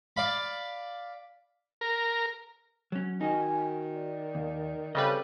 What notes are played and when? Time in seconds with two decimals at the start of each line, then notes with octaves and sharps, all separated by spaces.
0.17 D5 F5 B5
1.81 A#4
2.92 F#3 C#4
3.21 D#3 D#4 F#4 D#5 G#5
3.94 D5
4.35 D#2
4.95 C#3 G3 C4 A4 B4 D#5